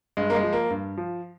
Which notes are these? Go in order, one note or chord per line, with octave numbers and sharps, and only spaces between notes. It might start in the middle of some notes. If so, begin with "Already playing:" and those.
G2 G#3
A#3
G#3
F3
A#3
G2
F3